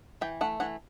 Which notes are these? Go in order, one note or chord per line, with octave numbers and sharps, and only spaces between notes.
E3 G5
A3 F#5
E3 F#5